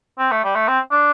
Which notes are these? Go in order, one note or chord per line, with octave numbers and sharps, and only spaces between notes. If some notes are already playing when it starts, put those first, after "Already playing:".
C4
A3
G3
A3
C4
D4